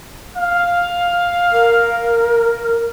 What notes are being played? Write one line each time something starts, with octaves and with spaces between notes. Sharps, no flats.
F5
A#4